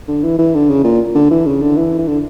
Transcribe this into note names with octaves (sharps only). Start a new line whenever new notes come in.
D3
E3
E3
D3
C#3
A#2
D3
E3
C#3
D3
E3
E3
D3